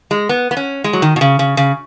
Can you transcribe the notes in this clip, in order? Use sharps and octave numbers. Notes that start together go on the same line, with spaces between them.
G#3
B3
B3
C#4
G#3
F#3
D#3
B2
C#3
C#3
C#3